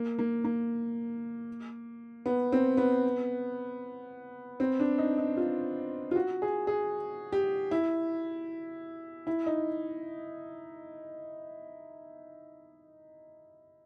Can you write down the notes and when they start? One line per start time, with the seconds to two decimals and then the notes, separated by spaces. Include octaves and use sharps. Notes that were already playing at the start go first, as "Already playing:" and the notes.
Already playing: A#3
0.19 A#3
0.44 A#3
2.26 B3
2.52 C4
2.77 B3
4.60 C4
4.80 D4
4.98 D#4
5.18 D#4
5.37 F4
6.11 F4
6.16 F#4
6.42 G#4
6.67 G#4
7.32 G4
7.71 E4
9.27 E4
9.46 D#4